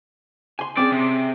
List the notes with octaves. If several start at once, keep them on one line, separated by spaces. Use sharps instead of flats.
G#5 C6
C4 C#4 G#4 D5
C3